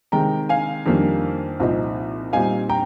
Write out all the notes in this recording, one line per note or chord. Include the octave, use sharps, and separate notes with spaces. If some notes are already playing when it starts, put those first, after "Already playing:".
C3 D#3 G#3 G5 A#5
F5 G#5
F2 D#3 G3 A#3 D4
C2 A#2 F3 C4 D#4
A#2 G3 C4 D#4 F5 G#5
G5 A#5